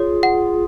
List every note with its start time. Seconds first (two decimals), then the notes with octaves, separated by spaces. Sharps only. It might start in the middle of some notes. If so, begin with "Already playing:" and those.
Already playing: F4 G#4 C#5
0.23 F#5